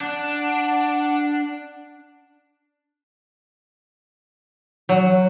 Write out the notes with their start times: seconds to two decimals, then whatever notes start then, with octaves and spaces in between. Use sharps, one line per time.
0.01 D4 F#5
4.89 F#3